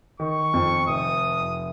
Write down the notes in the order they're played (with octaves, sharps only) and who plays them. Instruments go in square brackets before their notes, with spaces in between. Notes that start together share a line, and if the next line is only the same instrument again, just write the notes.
[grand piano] D#3 [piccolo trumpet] C#6
[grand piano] F2
[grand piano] F1 [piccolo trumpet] D#6